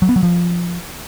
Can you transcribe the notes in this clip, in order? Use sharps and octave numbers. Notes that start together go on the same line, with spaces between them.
F#3
B3
F#3
F3